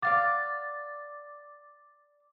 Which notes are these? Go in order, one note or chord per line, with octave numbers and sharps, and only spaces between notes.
D5 F5 F#5 D6 A6